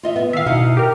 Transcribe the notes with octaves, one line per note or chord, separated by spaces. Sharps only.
F4 D#5 E5
B3
D#3 E5 F5
B2 D#4 E4 F#5
G4 A#4